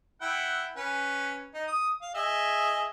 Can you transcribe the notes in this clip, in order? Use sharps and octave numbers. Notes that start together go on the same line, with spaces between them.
E4 F#5 G5
C#4 B4
D#4
D#6
F5
G#4 D#5 E5